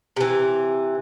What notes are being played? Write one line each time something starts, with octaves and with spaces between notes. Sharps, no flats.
C3 E3